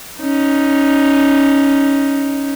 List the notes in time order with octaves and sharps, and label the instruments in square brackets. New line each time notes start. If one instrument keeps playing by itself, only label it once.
[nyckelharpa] C#4 D#4